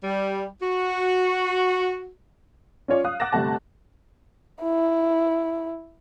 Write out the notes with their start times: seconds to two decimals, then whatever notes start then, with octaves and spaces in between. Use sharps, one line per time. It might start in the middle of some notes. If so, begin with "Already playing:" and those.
0.03 G3
0.61 F#4
2.88 C#4 F4 C#5 D5
3.05 F5 D#6 F#6
3.20 F#5 D6 F#6 A6 A#6 E7
3.32 G1 C3 A3 F#5 A5
4.62 E4